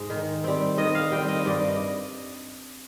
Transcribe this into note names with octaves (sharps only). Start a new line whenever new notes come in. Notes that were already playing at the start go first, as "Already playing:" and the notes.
Already playing: G#2 G#3
D#3
G3 C4
D#3 D#5
F5
G3 C4 G5
D#5
G2 D5
D#5